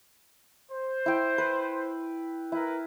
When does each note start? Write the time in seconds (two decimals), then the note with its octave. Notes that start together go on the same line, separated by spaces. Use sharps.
0.70 C5
1.06 E4 G5
1.38 B4
2.52 E4 A#4 B4